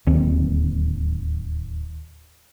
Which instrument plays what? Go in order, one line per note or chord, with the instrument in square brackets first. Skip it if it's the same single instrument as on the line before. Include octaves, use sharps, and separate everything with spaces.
[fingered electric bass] D1 D#2 D#3 C4